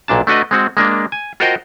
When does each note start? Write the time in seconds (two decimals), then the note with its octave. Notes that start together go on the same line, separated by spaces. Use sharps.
0.08 B1 A#2 D4 A5
0.27 A3 D4 F#4 B4 D#5
0.51 G#3 C4 F#4
0.77 G#3 A#3 D4
1.12 G#5
1.40 F4 F#4 A#4 C5 D#5 G5